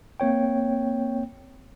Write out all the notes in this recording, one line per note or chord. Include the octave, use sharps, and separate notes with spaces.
A#3 C4 C#5 G5